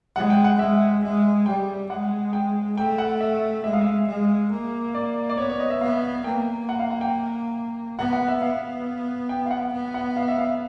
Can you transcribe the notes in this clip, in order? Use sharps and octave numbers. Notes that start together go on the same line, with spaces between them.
G#3 F#5
G5
F#5
G#3 E5
G#3 E5
G3 G5
G#3 F#5
G5
A3 G5
F#5
E5
G#3 E5
F5
E5
G#3
A#3
D5
D5
B3 C#5
C#5
D#5
E5
B3 F5
A#3 G5
F#5
F5
F#5
G5
B3 F#5
F#5
E5
B3 F5
G5
F5
F#5
B3
F#5
F5
E5
F5